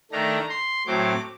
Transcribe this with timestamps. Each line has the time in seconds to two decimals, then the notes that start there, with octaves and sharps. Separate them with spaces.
0.12 D#3 A3 D4 A#5
0.49 C6
0.87 A2 F#3 C4 D6